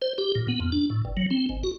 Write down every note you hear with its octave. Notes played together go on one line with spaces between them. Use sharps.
C5
G4
A#2
B3
F2
D4
A2
G1
F#3
C4
G#1
F#4